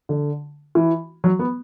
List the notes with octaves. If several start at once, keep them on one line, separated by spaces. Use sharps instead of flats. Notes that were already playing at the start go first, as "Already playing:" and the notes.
D3
E3
F#3
B3